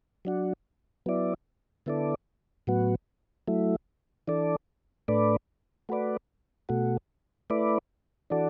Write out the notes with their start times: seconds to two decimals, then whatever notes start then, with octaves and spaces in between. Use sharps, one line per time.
0.25 F#3 D4 F#4
1.06 F#3 B3 E4 D5
1.86 D3 B3 E4 A4 D5
2.67 A2 F#3 B3 F#4
3.47 F#3 A3 E4
4.28 E3 D4 A4 D5
5.08 A2 A3 D4 B4 D5
5.89 A3 F#4 B4 D5
6.69 B2 A3 F#4
7.50 A3 E4 B4 D5
8.30 E3 D4 F#4 A4 D5